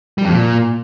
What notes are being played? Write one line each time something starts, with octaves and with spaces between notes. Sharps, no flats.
G3
F2
A#2